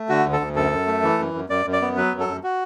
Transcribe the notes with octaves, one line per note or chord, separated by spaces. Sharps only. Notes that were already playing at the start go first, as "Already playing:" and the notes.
Already playing: A3
D3 F#4
D2
A4
D2
F#2 A4
F#2
A3
E3
F#2
F#2
F#2 D5
F#2
D5
B3
F#3 B4
F#2
A4
F#2
F#4